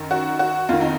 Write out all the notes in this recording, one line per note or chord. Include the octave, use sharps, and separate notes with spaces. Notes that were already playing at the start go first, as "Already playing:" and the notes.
Already playing: F#2 D#3
F#4
F#4
F2 D#3 F4
D#4